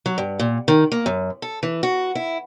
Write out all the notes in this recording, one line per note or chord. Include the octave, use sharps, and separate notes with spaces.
F#3
G2
A#2
D#3
A#3
F#2
A4
E3
F#4
E4